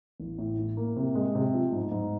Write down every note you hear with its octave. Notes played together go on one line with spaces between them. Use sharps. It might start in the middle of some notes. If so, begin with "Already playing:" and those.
A1
A2
A2
A#3
C3
G#3
C3
F3
G#2
G#2